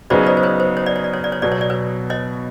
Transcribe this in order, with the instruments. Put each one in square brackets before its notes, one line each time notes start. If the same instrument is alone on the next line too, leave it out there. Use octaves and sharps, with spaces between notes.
[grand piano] C#3 F#3 B3 D#4 G#4 [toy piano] C5 D5
[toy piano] C5 D5
C5
B4 C#5
C5
C#5
D5
C#5
D5
C#5
D5
C#5
[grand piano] B2 F#3 B3 [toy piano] D5
[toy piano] C#5
D5
B4 C#5
C#5 D#5